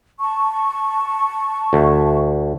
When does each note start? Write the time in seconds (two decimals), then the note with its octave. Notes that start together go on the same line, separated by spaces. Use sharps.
0.20 A5 C#6
1.73 D2